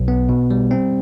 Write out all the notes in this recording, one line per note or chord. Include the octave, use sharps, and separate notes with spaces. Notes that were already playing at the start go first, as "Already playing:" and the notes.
Already playing: B1
B3
B2
G3
C4